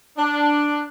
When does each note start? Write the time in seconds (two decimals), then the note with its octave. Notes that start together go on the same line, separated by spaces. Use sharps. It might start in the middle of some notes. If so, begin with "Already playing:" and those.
0.18 D4